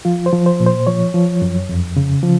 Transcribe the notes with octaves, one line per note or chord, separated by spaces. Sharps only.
F3 F4
C5
F3
C5
A#2
C5
F3 C#5
F3
F#2
F2
C#3
F3